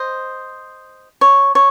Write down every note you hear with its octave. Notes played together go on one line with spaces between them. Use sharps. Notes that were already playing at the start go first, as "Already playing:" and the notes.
Already playing: C5 D#5
C#5
C#5